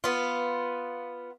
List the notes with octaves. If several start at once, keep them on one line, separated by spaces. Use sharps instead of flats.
B3 F4